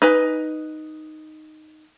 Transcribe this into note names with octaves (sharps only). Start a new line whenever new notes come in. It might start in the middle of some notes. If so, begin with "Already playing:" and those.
D#4 B4 G#5